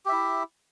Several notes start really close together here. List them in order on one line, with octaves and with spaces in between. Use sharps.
G4 E5 E4